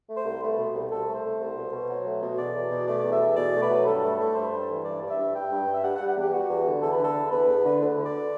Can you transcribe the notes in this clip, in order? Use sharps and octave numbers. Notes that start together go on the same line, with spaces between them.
A3
C5
C2
A3 B4
B2
C2
C2 A4
A3
C5
A3
C2
B2
B2
F#3
A3
B2
E2 D5
E2
B2
A3 D5
E2
E5
E2
B2 D5
A3
B4
F#3
G2 A4
A3
A3
G2 C5
G2
E3
G2 D5
G2 D5
E5
G2
G2 G5
G2
G2
E5
G3 F#5
F#5
G3
F#5
E2 G4
G3 F#4
E2
D3
E2 A4
B4
D3 A4
E2
E2 B4
E2
D3
D2
D3
D5